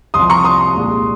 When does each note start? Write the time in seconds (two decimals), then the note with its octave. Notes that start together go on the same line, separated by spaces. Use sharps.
0.14 C2 C3 F3 C6 D#6
0.30 A#5 C#6
0.44 C6 D#6
0.75 C2 A#2 G#3